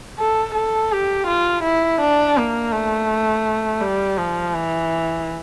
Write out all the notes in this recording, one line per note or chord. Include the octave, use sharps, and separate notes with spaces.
A4
A4
G4
F4
E4
D4
A#3
A3
G3
F3
E3